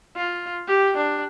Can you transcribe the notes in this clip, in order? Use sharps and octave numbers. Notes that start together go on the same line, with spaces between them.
F4
G4
D4